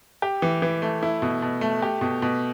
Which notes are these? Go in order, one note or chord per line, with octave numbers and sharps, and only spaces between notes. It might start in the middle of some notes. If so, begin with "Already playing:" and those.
G4
E3
E3
A3
E4
B2
B2
A3
G4
B2
B2